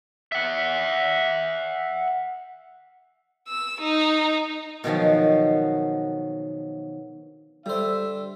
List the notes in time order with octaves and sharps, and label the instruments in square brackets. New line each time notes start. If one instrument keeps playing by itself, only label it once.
[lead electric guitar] E5 F#5
[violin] E6
D#4
[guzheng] B2 D#3 F3 F#3
[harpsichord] D3 C5 [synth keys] G3 [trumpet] E5